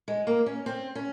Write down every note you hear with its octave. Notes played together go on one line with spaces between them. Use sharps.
G#3
A#3
C#4
C4
C#4